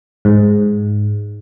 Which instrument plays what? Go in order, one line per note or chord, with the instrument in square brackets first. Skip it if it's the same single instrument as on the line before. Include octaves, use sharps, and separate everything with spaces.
[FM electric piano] G#2